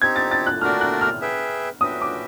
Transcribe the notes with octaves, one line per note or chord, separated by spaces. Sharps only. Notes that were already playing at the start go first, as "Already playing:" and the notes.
C4 D#4 G4 G#6
A6
A6
F#6
A3 D4 F#4 A#4 D5 F6
F#6
F6
G#4 B4 E5 G5
C#4 F#4 B4 E5 G5 D#6
D6